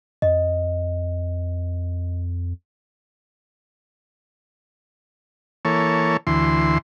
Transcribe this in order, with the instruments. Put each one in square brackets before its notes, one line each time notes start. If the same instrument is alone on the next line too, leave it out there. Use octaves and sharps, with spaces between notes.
[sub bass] F2 [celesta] D#5
[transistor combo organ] E3 A#3 A4 C#5
D2 E3 C6